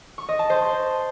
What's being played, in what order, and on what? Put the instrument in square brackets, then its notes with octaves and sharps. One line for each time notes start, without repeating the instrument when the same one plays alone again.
[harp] C#6
D#5
A5
C5